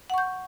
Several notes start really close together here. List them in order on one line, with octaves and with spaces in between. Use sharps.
F#5 C#6 G6